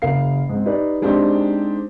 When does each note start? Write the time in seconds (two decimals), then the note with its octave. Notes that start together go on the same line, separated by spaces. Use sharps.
0.02 F#1 A#4 F5 C7
0.49 G#2 C4
0.66 D#4 G4 B4 D5
1.02 G#3 C4 D4 D#4 G4 C5